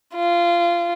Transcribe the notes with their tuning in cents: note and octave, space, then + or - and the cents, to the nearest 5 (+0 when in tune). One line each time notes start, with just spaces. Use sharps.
F4 -20